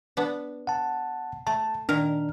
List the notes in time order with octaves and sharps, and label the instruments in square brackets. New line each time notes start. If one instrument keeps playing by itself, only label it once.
[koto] B3 D4
[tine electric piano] F#5 A5
[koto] A3 [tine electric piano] A5
[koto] A#2 D#3 A#4 [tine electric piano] D4 F6